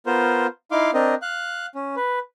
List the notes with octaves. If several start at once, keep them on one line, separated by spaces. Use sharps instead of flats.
B3 F4 A#4 C5
D#4 E4 F5 C6 D6
C4 D4 A#4 D#5
F5 F#6
C#4
B4